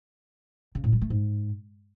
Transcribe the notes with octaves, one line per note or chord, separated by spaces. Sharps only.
C#3
A2
G3
A3
G#2